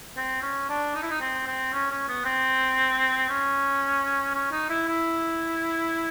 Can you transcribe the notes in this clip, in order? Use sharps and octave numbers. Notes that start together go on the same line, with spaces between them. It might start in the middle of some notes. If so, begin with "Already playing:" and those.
C4
C#4
D4
D#4
E4
D#4
C4
C4
C#4
C#4
B3
C4
C#4
C#4
D#4
E4
E4